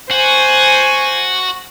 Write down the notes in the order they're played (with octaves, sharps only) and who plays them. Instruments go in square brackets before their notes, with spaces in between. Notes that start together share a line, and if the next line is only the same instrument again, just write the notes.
[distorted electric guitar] F#4 [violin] C5 G#5